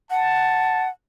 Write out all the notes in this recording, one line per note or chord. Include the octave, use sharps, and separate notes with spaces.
F#5 A5